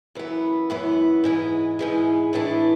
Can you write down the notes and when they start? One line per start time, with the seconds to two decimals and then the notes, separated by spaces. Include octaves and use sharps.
0.15 F#2 E3 B3
0.70 F#2 E3 B3
1.24 G#2 E3 G#3
1.79 G#2 E3 G#3
2.33 A2 E3 B3 D4